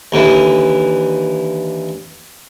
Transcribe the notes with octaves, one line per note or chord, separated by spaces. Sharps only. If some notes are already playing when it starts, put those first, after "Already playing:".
D#2 D3 E3